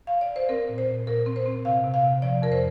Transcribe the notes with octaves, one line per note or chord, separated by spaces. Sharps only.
F5
D5
C5
C4 A#4
A#2
C5
A#2
A#2 A#4
C4
C5
C4
C3 F5
C3
F5
C3
F3 D5
F2 A#4
C5